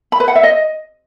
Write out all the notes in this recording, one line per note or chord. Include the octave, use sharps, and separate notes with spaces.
B5
B4
F#5
E5
D#5